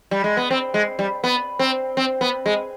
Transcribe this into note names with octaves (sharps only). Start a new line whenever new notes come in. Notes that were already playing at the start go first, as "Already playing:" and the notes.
G3
G#3
B3
C4
G#3
G3
B3
C4
C4
B3
G#3